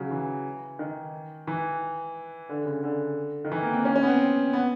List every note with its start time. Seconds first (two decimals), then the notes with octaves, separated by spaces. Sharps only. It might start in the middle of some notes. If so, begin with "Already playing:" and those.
Already playing: C#3 F#3
0.11 E3
0.79 D#3
1.47 E3
2.49 D3
2.65 C#3
2.83 D3
3.45 D#3
3.52 E3
3.63 A#3
3.73 C4
3.85 C#4
3.96 C#4
4.03 B3
4.07 C4
4.53 B3